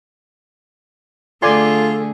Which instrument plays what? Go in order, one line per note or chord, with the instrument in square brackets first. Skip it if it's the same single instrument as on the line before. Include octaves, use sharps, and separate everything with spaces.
[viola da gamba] D3 A3 G#4 [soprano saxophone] F4 [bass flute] A4 [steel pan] D5 G#5 C6